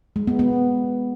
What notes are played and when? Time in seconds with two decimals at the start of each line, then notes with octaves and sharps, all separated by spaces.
0.16 G#3
0.27 B3
0.39 B3